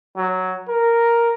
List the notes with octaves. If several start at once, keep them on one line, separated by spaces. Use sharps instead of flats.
F#3
A#4